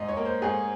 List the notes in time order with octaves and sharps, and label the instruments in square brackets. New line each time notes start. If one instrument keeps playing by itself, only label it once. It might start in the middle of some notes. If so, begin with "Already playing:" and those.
Already playing: [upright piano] G#2 D#5
C#5
A#3
C5
G#2 G#4